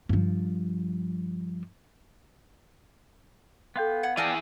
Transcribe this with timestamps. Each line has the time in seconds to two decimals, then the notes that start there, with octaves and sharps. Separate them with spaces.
0.09 G2 F3
3.76 B3 A4 F5 G5 C6 G6
4.03 F#5 G#6
4.17 E3 G#4 D5 G5 A5 E6 F6 A#6